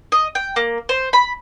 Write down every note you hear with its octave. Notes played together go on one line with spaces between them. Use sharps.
D#5
G5
A#3
C5
B5